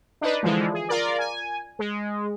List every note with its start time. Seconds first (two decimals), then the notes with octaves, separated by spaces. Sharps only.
0.21 D4 D#4 B4
0.43 D3 E3 F3 G#3
0.73 G#4
0.88 F4 A#4 D5
1.18 G#5
1.79 G#3